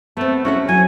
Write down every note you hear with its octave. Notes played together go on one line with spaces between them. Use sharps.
A3 B3 C4
C#4 E4 F#4 A4
F#3 G#5